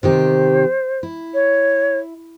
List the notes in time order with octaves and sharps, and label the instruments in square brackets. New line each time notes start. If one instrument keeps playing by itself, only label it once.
[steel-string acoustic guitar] C3 D#3 G4 [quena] C5
[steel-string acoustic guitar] E4
[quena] C#5